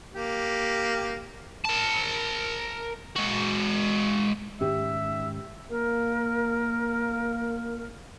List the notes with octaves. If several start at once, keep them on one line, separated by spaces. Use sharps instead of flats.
A#3 G4
A#4 A5
G#3 F#4
G#2 D#3 C#4 G4 E5
A#3 A#4